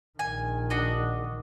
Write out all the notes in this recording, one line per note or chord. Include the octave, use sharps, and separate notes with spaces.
A#1 D#3 G#5
D4 F#4 D#5